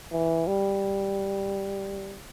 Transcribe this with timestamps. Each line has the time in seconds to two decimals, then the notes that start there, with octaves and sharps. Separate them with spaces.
0.12 E3
0.47 G3